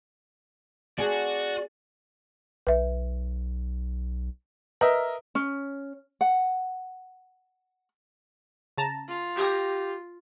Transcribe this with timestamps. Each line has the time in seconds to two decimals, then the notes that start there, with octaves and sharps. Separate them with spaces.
0.98 C4 F#4 G#4 D5
2.67 B1 B4 E5
4.81 A#4 B4 D#5 E5
5.35 C#4
6.21 F#5
8.77 C#3 A5 A#5
9.08 F4
9.37 G4 G#6 A#6